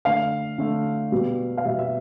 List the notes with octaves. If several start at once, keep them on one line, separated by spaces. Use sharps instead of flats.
D3 A3 F5
D3 A3
B2 G3 B3
F5
B2 G3 B3 E5
E5